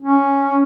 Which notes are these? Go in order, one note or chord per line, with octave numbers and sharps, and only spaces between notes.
C#4